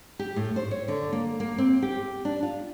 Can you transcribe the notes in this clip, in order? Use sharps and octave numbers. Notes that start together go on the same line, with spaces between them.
G4
A2
C5
C#5
D3
A#3
A#3
C4
G4
D4
F4